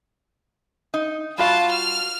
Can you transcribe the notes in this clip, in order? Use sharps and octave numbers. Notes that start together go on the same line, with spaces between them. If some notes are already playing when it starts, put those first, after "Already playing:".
D#4
G3 F4 F#4 F5 A5
F6